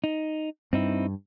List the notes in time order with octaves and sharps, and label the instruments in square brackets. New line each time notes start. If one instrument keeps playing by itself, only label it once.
[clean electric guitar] D#4
[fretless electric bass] G2 [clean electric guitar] C4 D#4 E4